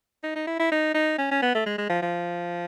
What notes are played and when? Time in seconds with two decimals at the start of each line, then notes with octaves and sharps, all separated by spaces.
0.23 D#4
0.36 D#4
0.47 E4
0.59 E4
0.72 D#4
0.94 D#4
1.18 C#4
1.31 C#4
1.42 B3
1.55 A3
1.66 G#3
1.78 G#3
1.90 F3
2.02 F3